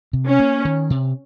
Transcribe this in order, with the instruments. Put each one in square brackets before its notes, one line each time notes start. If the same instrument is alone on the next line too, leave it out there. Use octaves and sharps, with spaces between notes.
[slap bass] C3
[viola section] C#4
[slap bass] A#3
D#3
C3